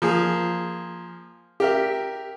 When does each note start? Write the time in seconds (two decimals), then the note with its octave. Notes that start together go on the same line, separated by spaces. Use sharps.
0.02 F3 A#3 G#4
1.60 G4 A#4 E5